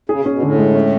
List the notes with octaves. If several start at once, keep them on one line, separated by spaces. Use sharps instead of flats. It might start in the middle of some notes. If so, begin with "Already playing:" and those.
C#3 G#4
B2
C#4
B2
A2 D3
G#3
C#4